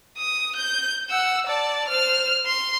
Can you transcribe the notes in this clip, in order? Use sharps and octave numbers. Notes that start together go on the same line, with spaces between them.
D#6
G6
F#5 E6
D5 A5
C5 F6
C6